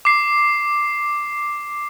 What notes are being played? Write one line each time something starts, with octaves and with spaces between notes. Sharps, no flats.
D6 C7